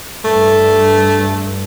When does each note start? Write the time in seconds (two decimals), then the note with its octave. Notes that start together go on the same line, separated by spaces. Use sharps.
0.24 G2 A3